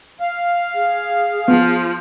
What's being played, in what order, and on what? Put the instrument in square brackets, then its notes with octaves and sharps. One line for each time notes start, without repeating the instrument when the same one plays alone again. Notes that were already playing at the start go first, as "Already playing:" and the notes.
[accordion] F5
[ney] G#4
[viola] F3 [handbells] B3